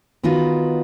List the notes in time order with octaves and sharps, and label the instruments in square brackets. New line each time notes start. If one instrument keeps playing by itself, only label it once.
[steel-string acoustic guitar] D#3 B3 D#4 F4 F#4 B4